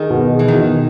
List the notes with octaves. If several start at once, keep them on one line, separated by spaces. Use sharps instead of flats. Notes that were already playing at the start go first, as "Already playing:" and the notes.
Already playing: D#3 G#4
B2
G#4
E3
D#3
B2